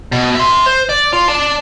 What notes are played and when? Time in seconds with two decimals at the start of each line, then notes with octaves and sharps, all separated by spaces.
0.12 B2
0.35 E5 C6
0.66 C5
0.89 D5
1.13 F4
1.28 D5 A5